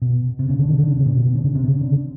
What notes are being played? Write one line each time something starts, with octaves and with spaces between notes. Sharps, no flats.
B2
C3
C#3
D3
D#3
D3
C#3
C3
A#2
B2
D3
C#3
C3
C#3
D3